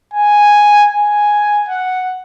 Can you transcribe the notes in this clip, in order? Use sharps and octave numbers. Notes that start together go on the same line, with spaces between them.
G#5
G#5
F#5